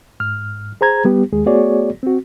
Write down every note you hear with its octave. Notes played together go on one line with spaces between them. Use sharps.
G#2 F6
G#4 C5 A#5 G#6
G3 B3 G4
D#2 G#3 G#4
A3 B3 F#4 G#4 C#5 D5
C4 F#4